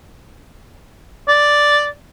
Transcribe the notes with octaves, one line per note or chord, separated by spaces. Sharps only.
D5